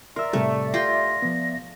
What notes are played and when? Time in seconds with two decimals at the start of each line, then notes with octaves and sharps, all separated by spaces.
0.16 A#4 D5 E5 C6 E6
0.33 A2 C3 G3 A3
0.74 F4 G4 G5 C6 A#6
1.22 F3 B3